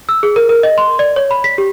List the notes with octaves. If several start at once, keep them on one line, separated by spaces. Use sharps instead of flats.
E6
G#4
A#4
A#4
D#5
C6
D5
C#5
B5
B6
G4